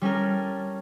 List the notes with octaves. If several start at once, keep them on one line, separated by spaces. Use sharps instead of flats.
G3 C#4 A4 A#4